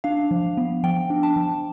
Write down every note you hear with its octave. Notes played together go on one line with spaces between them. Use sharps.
D4 F5
F3
B3
F3 G5
D4
A5
F3